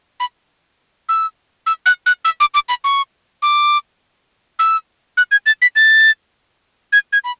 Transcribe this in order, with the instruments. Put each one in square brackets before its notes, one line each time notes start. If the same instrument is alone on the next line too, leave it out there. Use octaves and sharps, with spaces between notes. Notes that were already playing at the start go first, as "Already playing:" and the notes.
[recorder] B5
E6
E6
F#6
F#6
E6
D6
D6
B5
C#6
D6
E6
F#6
G#6
A6
B6
A6
G#6
G#6
B5